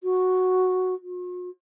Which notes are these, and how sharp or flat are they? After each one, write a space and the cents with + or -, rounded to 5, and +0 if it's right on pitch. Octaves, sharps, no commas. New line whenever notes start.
F#4 -5
F#4 -45